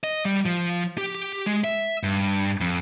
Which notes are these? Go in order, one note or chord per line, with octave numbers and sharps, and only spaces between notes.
D#5
G3
F3
G4
G#3
E5
G2
F2